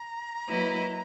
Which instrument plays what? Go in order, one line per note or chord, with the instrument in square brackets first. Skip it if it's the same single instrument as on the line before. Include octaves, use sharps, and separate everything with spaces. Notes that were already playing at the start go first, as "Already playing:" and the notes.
Already playing: [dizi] A#5
[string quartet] F#3 A#3 E4 B4 D#5